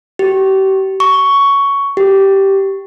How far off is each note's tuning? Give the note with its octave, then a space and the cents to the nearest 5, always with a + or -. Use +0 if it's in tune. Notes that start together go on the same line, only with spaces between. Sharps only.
G4 -35
C#6 +10
G4 -10